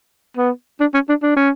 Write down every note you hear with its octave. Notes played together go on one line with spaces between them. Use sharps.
B3
D4
C#4
D4
D4
C#4